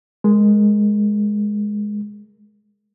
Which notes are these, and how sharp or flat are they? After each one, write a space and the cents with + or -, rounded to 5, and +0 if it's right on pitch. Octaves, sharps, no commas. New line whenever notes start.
G#3 +0 A#4 +0